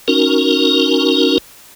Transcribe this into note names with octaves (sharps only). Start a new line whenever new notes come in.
C#4 D#4 F#4 A#4